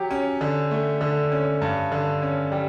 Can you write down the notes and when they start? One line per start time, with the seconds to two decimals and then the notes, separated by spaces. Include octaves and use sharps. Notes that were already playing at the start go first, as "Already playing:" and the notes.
Already playing: F#3 G4
0.11 C#4
0.41 D3
0.71 A3
1.01 D3
1.32 C#4
1.62 G2
1.92 D3
2.22 C#4
2.52 G3